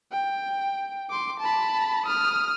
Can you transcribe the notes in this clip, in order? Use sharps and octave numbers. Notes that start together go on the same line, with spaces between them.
G5
C6 D6
A5 B5
D#6 F6